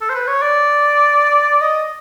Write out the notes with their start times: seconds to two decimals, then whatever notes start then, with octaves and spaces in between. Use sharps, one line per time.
0.01 A4
0.10 C5
0.15 B4
0.27 C#5
0.42 D5
1.61 D#5